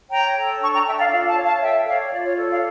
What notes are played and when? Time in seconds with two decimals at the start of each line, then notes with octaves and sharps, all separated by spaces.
0.10 C#5 G5 A#5
0.35 A4
0.60 D4 A5 C#6
0.73 G5 A#5
0.85 A4 E5 G5
0.98 D5 F5
1.11 F4 D5 F5
1.28 F5 A5
1.36 C#5
1.45 F5 A5
1.61 A4 E5 G5
1.86 C#5 D5 F5
2.12 F4 D5
2.25 C#5
2.37 A4 D5
2.50 D5 F5